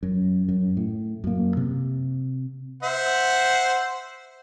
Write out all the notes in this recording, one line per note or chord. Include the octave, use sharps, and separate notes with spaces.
F#2
F#2
A2
F#2 A#3
C3
C5 E5 F#5